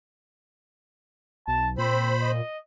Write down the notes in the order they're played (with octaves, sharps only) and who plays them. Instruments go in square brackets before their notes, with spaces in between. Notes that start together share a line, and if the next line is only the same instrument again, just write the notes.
[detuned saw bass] B1 [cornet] A5
[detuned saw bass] A#2 [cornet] C4 [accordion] C5 B5
[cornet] D#5